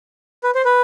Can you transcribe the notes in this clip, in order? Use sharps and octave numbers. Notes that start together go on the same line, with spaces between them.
B4
C5
B4